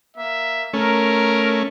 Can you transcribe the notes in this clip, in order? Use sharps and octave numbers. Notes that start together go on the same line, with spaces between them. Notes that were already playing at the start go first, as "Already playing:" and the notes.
A#3 E5
A3 C#4 A#4